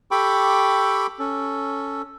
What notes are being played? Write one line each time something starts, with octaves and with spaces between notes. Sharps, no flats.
G4 A4 G5 B5 C#6 D6
C#4 A4